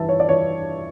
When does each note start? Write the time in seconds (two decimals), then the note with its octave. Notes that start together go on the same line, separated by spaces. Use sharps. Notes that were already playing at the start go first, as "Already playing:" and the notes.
Already playing: G2 E3 E5 A5
0.09 C#5
0.20 D5
0.29 E3 C#5